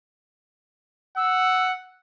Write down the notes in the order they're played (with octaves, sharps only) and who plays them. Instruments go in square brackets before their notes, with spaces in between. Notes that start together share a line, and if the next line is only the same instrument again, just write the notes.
[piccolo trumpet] F#5 [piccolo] E6